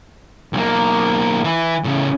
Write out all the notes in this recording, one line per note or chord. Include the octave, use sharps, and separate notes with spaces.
B1 A#3
E3
A2 C#3